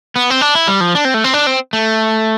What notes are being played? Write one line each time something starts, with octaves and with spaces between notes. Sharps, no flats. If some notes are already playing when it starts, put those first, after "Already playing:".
B3
C4
D4
E4
G3
F3
D4
C4
A3
C4
D4
C4
A3